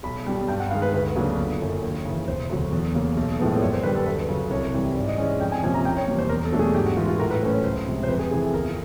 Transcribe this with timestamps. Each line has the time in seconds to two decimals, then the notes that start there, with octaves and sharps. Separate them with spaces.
0.03 B1 B5
0.26 B2 G3
0.48 G2 G5
0.60 F#5
0.71 D#3 G#3 F5
0.82 B4
0.93 D2 B4
1.16 C#3 F#3 A#3 D4
1.37 G1
1.60 F#2 D3
1.83 D#2
2.05 C#3 E3
2.28 E1 C5
2.49 D2 C#3 F#3
2.72 E2
2.94 C#3 F#3 A#3
3.17 B1
3.39 A2 F3 G#3 B3
3.58 D5
3.61 F#2 C#5
3.73 C5
3.83 D3 G3 B4
3.95 A4
4.06 D2 B4
4.28 C#3 F#3
4.50 C2 C#5
4.74 C3 E3 G3
4.95 G#2 D5
5.08 D#5
5.18 E3 G#3 C#4 D5
5.40 F2 G5
5.52 G#5
5.63 C3 F3 A#3 C#4 G#5
5.74 A#5
5.85 F#1 G5
5.96 C#5
6.07 E2 B2 G3 A#3 C#5
6.18 C5
6.29 E2 A#4
6.45 A4
6.52 B2 F#3 A3 D4
6.59 G#4
6.74 G#2 G4
6.86 F#4
6.97 E3 G#3 F4
7.08 F4
7.19 A2 A#4
7.31 B4
7.42 F#3 A3 C#4 C5
7.52 C#5
7.64 C#2 C5
7.86 C3 F3 G#3
8.03 C5
8.08 F2 B4
8.19 G#4
8.31 C3 E3 G#4
8.42 A4
8.53 G1 A#4